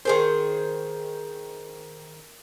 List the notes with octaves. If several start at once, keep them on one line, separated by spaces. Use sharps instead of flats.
D#3 G#4 A#4 C5 C6